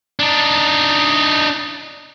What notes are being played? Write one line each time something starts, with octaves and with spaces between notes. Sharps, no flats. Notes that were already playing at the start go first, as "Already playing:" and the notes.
D4 D#4